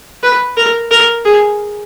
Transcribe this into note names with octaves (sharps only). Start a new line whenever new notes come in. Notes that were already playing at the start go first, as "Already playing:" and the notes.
B4
A#4
A#4
G#4